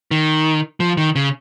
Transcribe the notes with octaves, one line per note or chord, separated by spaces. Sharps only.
D#3
F3
D#3
C#3